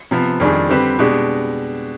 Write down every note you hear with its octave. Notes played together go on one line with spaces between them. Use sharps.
C3 F3 B3
F2 D#3 G3 D4 G#4
D3 G3 C4 G4 B4
B2 G#3 D4 G4